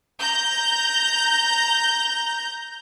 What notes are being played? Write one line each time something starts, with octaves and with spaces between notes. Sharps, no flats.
A#5 G6